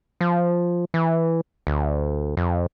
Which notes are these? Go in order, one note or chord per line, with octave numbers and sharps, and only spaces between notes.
F3
E3
D2
F2